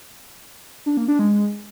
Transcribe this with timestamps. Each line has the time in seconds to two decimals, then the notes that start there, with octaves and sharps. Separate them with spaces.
0.86 D4
0.97 A#3
1.08 D4
1.19 G#3